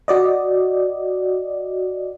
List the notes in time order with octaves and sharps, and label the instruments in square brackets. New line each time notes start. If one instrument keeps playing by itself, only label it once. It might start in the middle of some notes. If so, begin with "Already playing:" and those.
[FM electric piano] F#4 D5 D#5